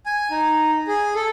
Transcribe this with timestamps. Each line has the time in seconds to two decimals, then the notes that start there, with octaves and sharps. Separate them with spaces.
0.06 G#5
0.31 D#4
0.88 G#4
1.15 A4